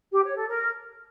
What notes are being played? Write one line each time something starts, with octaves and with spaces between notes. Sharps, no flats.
G4
C#5
A4
A#4